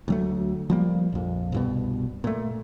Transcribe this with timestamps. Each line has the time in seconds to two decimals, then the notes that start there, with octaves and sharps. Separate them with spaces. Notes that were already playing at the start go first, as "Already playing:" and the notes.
0.08 D2 F#3 A3
0.70 F3 G3 A#3
1.13 A#1 F2
1.52 C2 G2 B2
2.24 A#2 A3